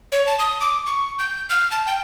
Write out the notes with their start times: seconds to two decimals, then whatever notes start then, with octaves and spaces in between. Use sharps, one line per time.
0.12 C#5
0.27 A5
0.39 D#6
0.61 D6
0.86 C#6
1.19 G6
1.50 F6
1.71 A5
1.87 G5